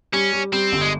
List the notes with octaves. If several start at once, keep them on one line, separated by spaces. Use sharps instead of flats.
G3 C#4
G3
G3 C4
G1
G#3